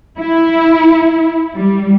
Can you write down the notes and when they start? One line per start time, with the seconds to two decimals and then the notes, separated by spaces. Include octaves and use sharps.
0.19 E4
1.55 G3